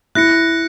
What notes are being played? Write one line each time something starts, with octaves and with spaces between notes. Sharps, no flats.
E4 F#6 A#6 C#7